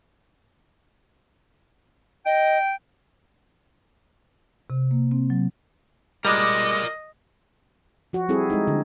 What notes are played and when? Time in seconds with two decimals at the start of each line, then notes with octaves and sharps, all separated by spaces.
2.26 D#5 G5
4.70 C3
4.91 A#3
5.11 C4
5.30 F#3
6.25 G3 G#3 A#4 D5 D#5
8.13 F3 F#4
8.29 G3 C4 E4 G#4 A4
8.50 G#3 D#4
8.67 D3